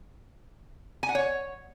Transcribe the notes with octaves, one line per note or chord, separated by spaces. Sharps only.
G#5
F#5
C#5